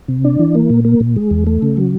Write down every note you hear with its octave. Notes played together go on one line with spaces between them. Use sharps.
C3
D4
E3
A#3
A#2
A#3
A#2
G#3
E2
A3
C#3
F#3